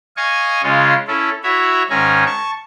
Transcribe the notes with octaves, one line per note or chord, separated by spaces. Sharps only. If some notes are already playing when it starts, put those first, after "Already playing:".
D#5 F5 G#5 C#6
C#3 G#3 C#4 F4
C#4 E4 A4
E4 F#4 C#5 E5
G#2 D#3 C#4 G#5 A#5
A5 C#6